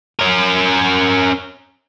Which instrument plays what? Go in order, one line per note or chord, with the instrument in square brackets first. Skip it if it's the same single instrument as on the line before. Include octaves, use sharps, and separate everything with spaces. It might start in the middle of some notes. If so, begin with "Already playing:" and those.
[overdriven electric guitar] C#4 A#4